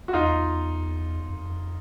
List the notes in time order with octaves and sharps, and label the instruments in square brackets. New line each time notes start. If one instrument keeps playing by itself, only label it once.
[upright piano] F#4
[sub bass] E2 [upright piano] D#4 F4
[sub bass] F2